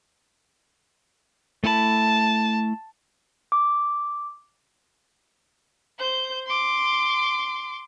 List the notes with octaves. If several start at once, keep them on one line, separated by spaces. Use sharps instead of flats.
A3 E4 A5 B5
D6
C5 G6
C6 D6